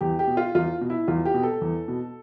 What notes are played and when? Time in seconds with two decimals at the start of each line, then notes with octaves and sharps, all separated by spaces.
0.01 E2 G4
0.19 G4
0.27 B2
0.37 F4
0.55 E2 F4
0.81 B2
0.90 E4
1.08 E2 F4
1.25 G4
1.34 B2
1.43 A4
1.61 E2
1.88 B2